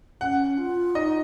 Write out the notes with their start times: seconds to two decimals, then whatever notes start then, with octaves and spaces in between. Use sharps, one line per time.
0.21 C#4 F#5
0.58 F4
0.95 D#4 D#5